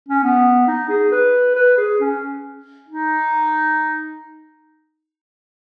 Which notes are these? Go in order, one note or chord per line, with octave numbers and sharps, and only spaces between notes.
C#4
B3
D#4
G#4
B4
B4
G#4
C#4
D#4